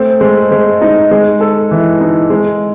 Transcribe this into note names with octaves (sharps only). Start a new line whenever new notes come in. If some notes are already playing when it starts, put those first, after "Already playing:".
Already playing: A3 C4
G#3
G#3
D#4
G#3
A4
E3
D#4
G#3